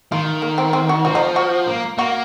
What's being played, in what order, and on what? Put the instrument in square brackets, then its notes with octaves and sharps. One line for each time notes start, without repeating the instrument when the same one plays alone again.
[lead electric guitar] D#3 [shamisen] F4
[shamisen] A#3
C4
C4
F#4
[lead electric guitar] F3 [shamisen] F#4
[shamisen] D#4
F#4
[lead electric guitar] A#3
[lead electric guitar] A#3 [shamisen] F#4